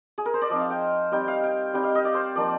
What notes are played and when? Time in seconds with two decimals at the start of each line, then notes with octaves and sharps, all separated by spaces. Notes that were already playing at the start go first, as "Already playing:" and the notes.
0.18 G#4
0.26 A#4
0.34 C5
0.42 D5
0.50 F3 C4 D#4 D#5
0.60 F5
0.70 G5
1.12 G3 C4 D#4 G5
1.28 F5
1.43 G5
1.74 G3 C4 D#4 G5
1.84 F5
1.95 D#5
2.05 D5
2.15 C5
2.36 F3 A#3 D#4 D5